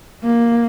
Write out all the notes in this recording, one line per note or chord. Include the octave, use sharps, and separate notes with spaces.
A#3